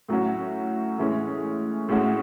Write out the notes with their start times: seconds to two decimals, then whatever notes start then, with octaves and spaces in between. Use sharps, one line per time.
0.08 A2 F#3 C#4 F#4
0.98 A2 E3 G#3 C#4
1.88 A2 G#3 C#4 F#4